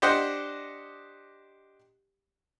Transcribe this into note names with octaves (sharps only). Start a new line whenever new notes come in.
D4 G4 C5 D#5 F#5